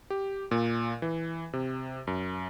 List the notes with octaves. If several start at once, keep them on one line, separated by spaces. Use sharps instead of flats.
G4
A#2
E3
C3
F#2